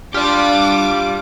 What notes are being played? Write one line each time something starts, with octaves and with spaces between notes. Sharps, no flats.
D4 F4 G4 D5 D6